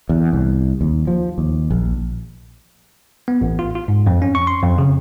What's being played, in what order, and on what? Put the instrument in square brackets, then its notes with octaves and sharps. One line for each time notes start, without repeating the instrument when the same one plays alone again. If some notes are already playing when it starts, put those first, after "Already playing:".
[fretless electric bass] E2
C2
D#2
F3
D#2
A#1
[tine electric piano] B3
A1
F4
F4
G#2
F2
C#4
C#6
C6
F2
C#3